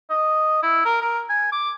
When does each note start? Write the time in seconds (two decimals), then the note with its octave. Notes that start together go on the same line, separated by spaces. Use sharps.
0.10 D#5
0.63 E4
0.85 A#4
1.01 A#4
1.29 G#5
1.52 D6